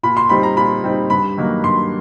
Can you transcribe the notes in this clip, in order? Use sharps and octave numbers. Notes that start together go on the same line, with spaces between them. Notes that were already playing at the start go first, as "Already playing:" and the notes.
A#2 B5
C6
G3 C4 D#4 B5
A#5
A#2 B5
G3 C4 D#4
G2 B5
D#3 F#3 A#3 D#4
G2 C6